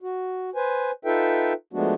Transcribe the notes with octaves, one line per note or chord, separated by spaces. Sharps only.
F#4
B4 C5 G#5
D#4 F4 A4 B4 E5 G5
F3 G#3 A3 B3 D4 F#4